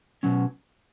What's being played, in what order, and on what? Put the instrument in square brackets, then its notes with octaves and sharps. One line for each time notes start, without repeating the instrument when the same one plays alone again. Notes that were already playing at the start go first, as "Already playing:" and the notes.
[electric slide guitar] B2 F#3 C#4